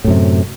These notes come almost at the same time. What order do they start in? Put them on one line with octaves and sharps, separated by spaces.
A2 F#2 C3